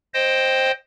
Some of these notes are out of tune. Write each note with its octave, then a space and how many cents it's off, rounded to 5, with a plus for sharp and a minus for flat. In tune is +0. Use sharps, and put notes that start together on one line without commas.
C5 +10 D#5 +0 G5 +0